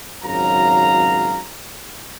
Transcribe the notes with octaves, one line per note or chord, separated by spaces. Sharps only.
G#1 C#2 F#2 F#3 F5 A#5